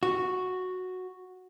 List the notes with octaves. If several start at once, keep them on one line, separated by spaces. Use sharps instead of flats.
F#4